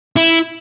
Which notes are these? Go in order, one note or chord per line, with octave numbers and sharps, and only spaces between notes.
E4